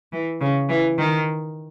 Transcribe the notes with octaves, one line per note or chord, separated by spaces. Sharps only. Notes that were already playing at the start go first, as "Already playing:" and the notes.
E3
C#3
E3
D#3